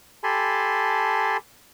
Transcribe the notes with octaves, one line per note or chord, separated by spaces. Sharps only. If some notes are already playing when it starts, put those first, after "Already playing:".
G4 A4 G#5 A5 B5 C6